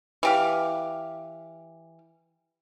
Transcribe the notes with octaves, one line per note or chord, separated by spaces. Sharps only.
E3 G4 F5